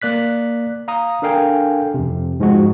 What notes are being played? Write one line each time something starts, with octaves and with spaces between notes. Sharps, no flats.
A#3 D5 F#6 B6
F5 A#5 D#6
D4 A4 A#4 F5 G5 G#5
F2 C3
G#2 F3 G#3 F#4